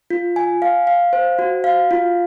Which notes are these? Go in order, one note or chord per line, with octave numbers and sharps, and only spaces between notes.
F4
G#5
F5
F5
C5
F#4
F5
F4